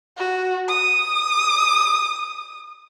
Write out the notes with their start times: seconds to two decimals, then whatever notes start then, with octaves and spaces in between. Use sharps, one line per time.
0.17 F#4
0.68 D#6